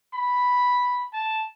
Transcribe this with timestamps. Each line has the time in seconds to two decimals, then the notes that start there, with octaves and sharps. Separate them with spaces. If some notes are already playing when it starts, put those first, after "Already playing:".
0.14 B5
1.13 A5